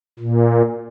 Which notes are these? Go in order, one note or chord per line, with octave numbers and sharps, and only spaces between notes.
A#2